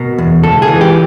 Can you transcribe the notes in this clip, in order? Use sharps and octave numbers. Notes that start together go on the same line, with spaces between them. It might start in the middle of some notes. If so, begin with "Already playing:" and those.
Already playing: B2 A#4
E2
C#2 A4
G#4
E3
G4